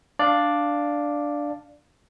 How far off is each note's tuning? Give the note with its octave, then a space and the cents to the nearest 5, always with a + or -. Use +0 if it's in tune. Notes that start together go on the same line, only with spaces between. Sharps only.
D4 +0 D5 +0 F5 +0